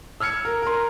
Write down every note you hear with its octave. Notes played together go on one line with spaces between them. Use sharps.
E6 F6 G#6 C#7
A#4
A#4 C6